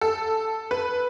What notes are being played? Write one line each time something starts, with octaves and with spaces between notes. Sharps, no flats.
A4
B4